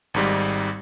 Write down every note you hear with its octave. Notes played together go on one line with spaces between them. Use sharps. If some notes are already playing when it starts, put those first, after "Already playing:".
G#1 G#2 G3